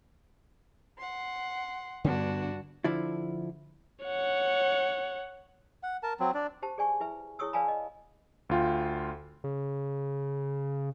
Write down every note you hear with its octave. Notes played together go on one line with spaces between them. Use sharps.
F#5 C6
G2 D3 B3 D4 F#4
D3 F3 E4
C#5 F#5
F#5
A#4 A5
F#3 C4
D4 D5
G4 C5 A5
G#4 D5 G#5 C#6
E4 B4 E5
E4 G#4 C#5 C#6 D#6 E6
B4 D5 F5 G#5 A5 B5
D#5
D2 F4 G5
C#3